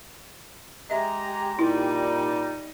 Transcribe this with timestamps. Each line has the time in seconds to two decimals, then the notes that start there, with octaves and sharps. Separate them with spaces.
0.90 G#3 G4 D#5 E5 A#5
1.59 A#2 G3 D#4 E4